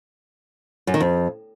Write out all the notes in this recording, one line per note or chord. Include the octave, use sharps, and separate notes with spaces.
F#2
D#3
F2